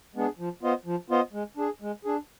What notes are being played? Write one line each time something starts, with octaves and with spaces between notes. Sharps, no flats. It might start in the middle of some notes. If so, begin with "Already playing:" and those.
G#3 B3 D4 G#4
F3
B3 F4 C5 D#5
F3
B3 F4 C5 D#5
G#3
D4 G#4
G#3
D4 G#4